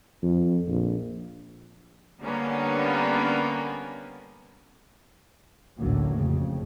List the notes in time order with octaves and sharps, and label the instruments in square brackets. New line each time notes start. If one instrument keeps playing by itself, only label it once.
[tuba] F2
A#1
[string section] D3 G3 A#3 B3 C#4
[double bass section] A1 D2 D3 F#3 A#3
F2 C#3